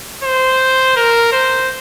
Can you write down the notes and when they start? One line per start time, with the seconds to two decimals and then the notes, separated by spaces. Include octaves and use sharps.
0.24 C5
0.96 A#4
1.32 C5